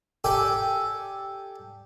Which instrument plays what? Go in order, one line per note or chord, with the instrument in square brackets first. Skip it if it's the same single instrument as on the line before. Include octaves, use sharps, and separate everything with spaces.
[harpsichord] G4 A4 D5 G5 G#5